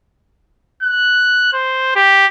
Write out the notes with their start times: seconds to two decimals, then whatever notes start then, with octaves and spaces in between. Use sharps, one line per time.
0.83 F#6
1.53 C5
1.96 G4